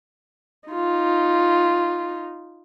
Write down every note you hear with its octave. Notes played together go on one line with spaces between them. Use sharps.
D#4 F4